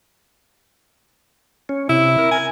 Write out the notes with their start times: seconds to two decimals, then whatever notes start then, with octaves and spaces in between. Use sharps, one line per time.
1.69 C#4
1.89 C3 E4
2.18 A#4
2.31 G#5